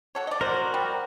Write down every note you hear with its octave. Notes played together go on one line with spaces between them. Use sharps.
F#4 A4 C#5
D5 D#5
F#4 A#4 C5
G3